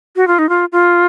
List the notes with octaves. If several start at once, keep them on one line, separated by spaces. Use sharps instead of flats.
F#4
F4
D#4
F4
F4